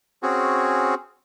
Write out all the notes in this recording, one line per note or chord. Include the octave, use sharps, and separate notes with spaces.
C4 C#4 F#4 G#4